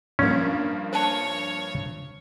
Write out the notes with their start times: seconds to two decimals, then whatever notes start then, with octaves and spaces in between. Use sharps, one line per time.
0.19 G2 F3 A#3 C#4
0.93 C5 C#5 A5